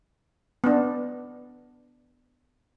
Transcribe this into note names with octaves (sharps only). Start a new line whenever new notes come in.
B3 D4